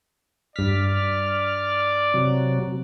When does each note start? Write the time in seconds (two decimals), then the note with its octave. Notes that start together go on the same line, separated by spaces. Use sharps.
0.56 G2 D5 F6 B6
2.14 C3 F#3